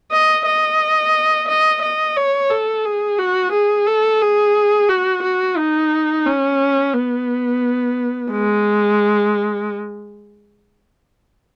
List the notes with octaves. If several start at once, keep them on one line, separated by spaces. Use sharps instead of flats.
D#5
D#5
D#5
D#5
C#5
A4
G#4
F#4
G#4
A4
G#4
F#4
F#4
D#4
C#4
B3
G#3